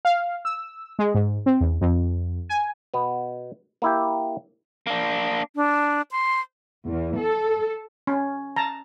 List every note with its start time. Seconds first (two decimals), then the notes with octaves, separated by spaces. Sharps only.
0.05 F5
0.45 E6
0.99 G#3
1.14 G#2
1.46 C4
1.60 E2
1.81 F2
2.49 G#5
2.94 B2 B3
3.82 A#3 E4 G4
4.87 A#3 D4
5.56 D4
6.11 C6
6.87 E2
7.19 A4
8.07 C#4
8.56 A5 A#5